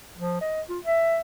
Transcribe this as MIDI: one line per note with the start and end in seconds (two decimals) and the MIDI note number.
0.18 0.40 53
0.41 0.62 75
0.69 0.79 65
0.85 1.21 76